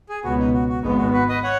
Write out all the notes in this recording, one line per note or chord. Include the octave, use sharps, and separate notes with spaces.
G#4
C#2 B2 B3 F#4
D#4
F#4
F#4
G#1 G#2 G#3 B3 D#4
F#4
F#4 B4
B4 D#5
C#5 F#5